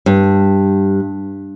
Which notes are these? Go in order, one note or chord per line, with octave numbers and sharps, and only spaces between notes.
G2